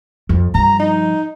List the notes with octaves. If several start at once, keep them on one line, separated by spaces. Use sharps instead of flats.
F2
G2 F3 A#5
D#4